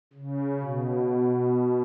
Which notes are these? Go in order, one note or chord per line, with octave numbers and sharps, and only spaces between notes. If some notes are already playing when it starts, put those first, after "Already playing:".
C#3
B2